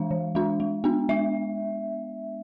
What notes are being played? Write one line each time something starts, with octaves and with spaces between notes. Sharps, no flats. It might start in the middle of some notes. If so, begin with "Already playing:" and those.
Already playing: E3 G#3 D4 F5
E3
G#3 D4
G#3
B3 D4
G#3 E5